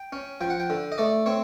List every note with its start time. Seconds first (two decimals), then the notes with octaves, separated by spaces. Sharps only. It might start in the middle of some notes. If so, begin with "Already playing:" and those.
Already playing: G5
0.13 C#4
0.41 F3 G5
0.50 F#5
0.60 G5
0.70 D3
0.92 D#5
0.98 A3 D5
1.26 C4 C#5